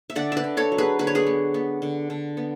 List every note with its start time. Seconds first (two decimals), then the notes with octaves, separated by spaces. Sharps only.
0.10 E5
0.16 D3 D5 F#5
0.32 B4 D5 E5
0.44 D3
0.57 A4 C#5
0.72 F#3
0.78 G#4 B4
0.99 D3 B4
1.07 C#5
1.15 G#4 B4
1.27 B3
1.54 B3
1.82 D3
2.10 D3
2.37 B3